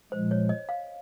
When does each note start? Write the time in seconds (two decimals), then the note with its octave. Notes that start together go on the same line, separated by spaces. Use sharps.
0.12 A#2 F3 G#3 C5
0.31 C#5
0.49 D#5
0.69 F5